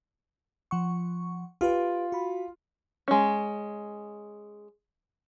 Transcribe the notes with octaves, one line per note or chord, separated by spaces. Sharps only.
F3 F#5 C#6
F4 G4 B4
F#4 B5
G#3 C#4